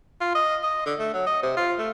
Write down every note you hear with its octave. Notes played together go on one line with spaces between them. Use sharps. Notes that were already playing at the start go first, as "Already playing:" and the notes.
F4
D#5
D#5
D3
A3
F#3
D#5
C3
F4
A3